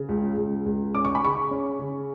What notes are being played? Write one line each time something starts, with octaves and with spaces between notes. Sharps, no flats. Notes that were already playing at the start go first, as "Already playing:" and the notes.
Already playing: C#3
C#2
C#2
C#2
C#4 D6
C#6
B5
C#3 C#6
C#4
C#3